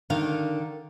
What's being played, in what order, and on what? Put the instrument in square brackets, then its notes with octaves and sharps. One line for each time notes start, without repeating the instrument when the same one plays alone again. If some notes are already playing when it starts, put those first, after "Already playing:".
[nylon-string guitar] D3 D#3 F5